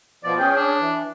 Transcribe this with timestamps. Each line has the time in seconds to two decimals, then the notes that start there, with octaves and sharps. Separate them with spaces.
0.24 B2 F3 D5
0.39 C#4 G#4 G5
0.56 D4
0.80 E3